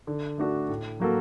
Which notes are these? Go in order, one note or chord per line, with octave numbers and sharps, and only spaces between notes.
D3
A3 D4 F#4 A4
A2
F#3 A#3 F#4 A4